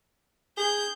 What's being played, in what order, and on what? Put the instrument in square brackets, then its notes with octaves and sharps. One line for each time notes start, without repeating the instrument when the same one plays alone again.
[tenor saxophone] G#4 [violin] G6